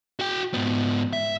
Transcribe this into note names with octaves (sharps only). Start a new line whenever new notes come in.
F#4 G5
G#2 B3
E5